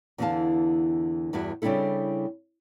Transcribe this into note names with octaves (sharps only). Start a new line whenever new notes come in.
E2 D3 E3 B3 F5 A5
E2 G2 E4 F#4
C#3 G3 C4 D4 E4 A4